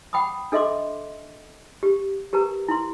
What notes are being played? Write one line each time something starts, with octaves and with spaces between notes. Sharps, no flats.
F#5 G5 B5 D6 D#6
D4 A4 D#5 E5 C6 D6
G4
G4 A#4 B4 A#5
E4 C6